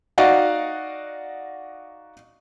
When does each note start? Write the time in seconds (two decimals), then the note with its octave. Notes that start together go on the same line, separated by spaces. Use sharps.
0.18 D#4 F#4 D5 D#5 F5 F#5